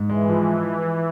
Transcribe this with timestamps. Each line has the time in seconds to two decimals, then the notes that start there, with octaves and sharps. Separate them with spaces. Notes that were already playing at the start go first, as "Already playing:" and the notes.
Already playing: G#2
0.10 E3 G#3
0.28 F3